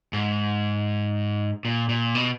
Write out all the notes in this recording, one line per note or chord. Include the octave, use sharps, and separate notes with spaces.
G#2
A#2
A#2
B2